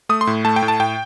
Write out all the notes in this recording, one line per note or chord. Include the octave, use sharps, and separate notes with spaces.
A3 D#6
C6
A2
A3 A5
G5
A2
A5
A2 G5